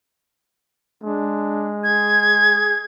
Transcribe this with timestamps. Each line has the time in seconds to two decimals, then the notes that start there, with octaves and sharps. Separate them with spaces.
1.03 G#3 D4
1.84 G#4 G#6